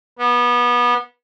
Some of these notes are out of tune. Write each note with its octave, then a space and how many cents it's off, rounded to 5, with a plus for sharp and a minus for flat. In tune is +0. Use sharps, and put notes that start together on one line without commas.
B3 -25